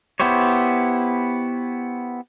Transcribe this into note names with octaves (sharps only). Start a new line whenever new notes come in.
B3 E4 G4 C5 C#5